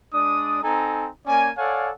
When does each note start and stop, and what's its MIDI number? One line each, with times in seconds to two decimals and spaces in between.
0.13 0.60 56
0.13 0.60 62
0.13 0.60 74
0.13 0.60 87
0.63 1.09 60
0.63 1.09 63
0.63 1.09 69
0.63 1.09 80
0.63 1.09 82
1.27 1.51 58
1.27 1.51 61
1.27 1.51 74
1.27 1.51 80
1.58 1.91 69
1.58 1.91 73
1.58 1.91 74
1.58 1.91 77
1.58 1.91 78
1.58 1.91 80